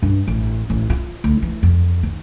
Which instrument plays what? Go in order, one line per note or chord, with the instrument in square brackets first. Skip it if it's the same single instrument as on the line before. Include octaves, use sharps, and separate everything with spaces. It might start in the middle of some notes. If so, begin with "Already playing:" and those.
[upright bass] G2
A1
A1
F4
D2
E3
F2
D#3